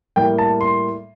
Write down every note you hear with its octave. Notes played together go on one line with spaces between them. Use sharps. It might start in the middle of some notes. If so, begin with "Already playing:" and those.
A2 G3 A#3 G5
A5
C6